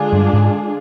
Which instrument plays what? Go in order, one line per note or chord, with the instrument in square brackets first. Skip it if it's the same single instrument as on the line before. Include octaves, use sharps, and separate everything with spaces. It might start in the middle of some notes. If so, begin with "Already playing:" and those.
Already playing: [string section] D3 G#3 D4 F4 G#4
[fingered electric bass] G2
G#2